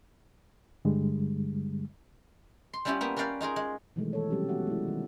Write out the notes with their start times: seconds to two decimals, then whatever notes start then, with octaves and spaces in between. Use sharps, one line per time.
0.85 G2 D3 G3 G#3
2.73 C6
2.85 G3 B3 C#4 E4 F4 G4
3.01 A#3 B3 G4
3.16 C#4 A#4 B4 D5 F5 G5
3.41 D#4 F4 G#4 A#4
3.56 G#3
3.96 B2 D#3 E3 F#3 G#3 A3
4.13 E3 A4 C#5
4.30 C3 F#3 G3 C4 C#4 G4
4.49 B3 F#4 E5 F#5
4.67 G#3 E4
4.88 D#3